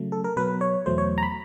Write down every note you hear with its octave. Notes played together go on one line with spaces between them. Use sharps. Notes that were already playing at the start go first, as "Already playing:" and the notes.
Already playing: C#3 F#3 A3
A4
A#4
B2 F#3 B3 B4
C#5
E2 B2 F#3 A3 C5
C#5
A#5
B5